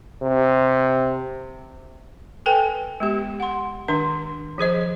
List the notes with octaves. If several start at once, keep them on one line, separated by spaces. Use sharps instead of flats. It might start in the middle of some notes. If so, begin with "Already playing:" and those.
C3
A4 B4 G5 G#5
G#3 B3 G4
F#5 C6
D#3 D4 C6
F3 G#4 C5 D#5